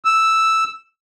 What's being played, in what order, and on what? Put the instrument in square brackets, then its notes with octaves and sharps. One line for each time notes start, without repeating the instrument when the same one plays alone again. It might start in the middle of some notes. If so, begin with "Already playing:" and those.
[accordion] E6